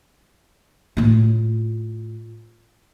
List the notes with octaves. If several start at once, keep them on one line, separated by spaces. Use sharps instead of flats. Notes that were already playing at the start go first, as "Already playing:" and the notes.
A2 F4